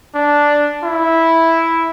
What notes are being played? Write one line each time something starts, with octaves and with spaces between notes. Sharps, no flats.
D4
E4